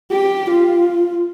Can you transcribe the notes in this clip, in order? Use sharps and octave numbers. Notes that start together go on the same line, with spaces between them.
G4
F4